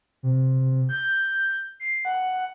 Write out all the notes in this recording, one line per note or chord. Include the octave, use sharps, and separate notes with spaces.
C3
G6
C7
F#5